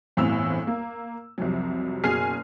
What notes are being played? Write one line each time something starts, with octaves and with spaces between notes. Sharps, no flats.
G1 E2 A2 C4 E6 F7
A#3
C2 F2 C3 F#3
F#1 B2 G#4 G#5 F6 C7